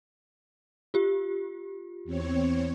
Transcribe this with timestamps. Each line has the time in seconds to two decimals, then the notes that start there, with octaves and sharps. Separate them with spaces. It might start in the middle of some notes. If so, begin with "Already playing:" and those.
0.94 F4 G4
2.04 E2 C4 C#5